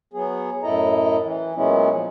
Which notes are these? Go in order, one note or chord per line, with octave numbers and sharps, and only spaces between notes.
F#3 B3 G#4
F#2 A2 E4 A4 D#5 A#5
E3
A#2 F#3 G#3 B3 C#4 E4
F3